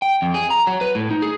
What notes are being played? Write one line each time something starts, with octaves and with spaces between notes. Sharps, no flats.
G5
F2
G#4
A#5
F#3
B4
A2
D#4
G#4